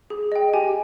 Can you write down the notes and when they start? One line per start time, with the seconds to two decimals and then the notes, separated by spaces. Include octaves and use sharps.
0.10 G#4
0.32 D#5 G5
0.54 G4 G#5